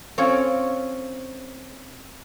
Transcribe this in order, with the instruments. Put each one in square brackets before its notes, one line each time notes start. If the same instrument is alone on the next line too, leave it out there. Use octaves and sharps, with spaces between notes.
[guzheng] C4 C#4 F4 C#5